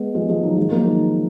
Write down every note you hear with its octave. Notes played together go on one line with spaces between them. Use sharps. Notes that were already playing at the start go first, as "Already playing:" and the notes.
Already playing: G#3 B3
F3 G#3
F3 G#3
D#3 F#3
F3 G#3
F#3 A#3
D#3